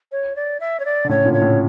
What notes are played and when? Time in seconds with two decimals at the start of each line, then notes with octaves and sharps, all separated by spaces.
0.12 C#5
0.36 D5
0.60 E5
0.80 C#5
0.85 D5
1.05 D3
1.09 A2 C#3 C#5
1.25 A#2 D3
1.33 C#5
1.41 A2 C#3